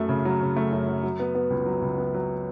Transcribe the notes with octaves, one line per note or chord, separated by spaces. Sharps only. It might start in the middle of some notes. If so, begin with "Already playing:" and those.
Already playing: F#2 A3
C#3
F#3
C#3
A3
F#2
F#3
F#3
B3
B3
C#2
F#3
C#2
B3
F#3